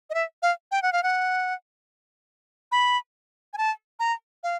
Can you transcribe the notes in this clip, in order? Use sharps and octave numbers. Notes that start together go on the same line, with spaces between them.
D#5
E5
F5
G5
F#5
F5
F#5
B5
G#5
A5
A#5
F5